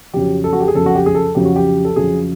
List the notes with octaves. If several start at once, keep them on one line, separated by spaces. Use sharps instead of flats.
F2 C#3 F#3 G4
A4
F#4
G4
G#4
F2 C#3 F#3 A4
F#4
G4
G#4
A4
F2 C#3 F#3 G4
F#4
G4
A4
F2 C#3 F#3 G#4